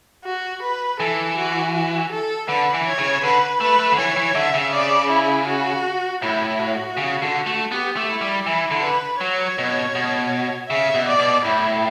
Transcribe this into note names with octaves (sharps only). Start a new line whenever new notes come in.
F#4
B4
E3 A4
F#4
F#4
A4
D3 B4
E3
C#5
C#3
D3 B4
A3 B4
A3
D3
E3 C#5
E3
D3 E5
C#3
D5
E4
F#4
A2 E4
F#4
C#3
D3
A3
B3 G4
A3
E4
G3
E3 E4
D3
B4
F#3 C#5
B2
B2
C#3 E5
B2
D5
B2
A2 E4